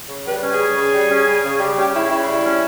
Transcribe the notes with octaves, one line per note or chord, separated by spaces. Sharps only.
C#3
G3 B4
C#4
G#4
C#3
C#3
G3
C#4
C#3
C#3
G3
C#4 G4
C#3 E4
C#3 E4
G3
C#4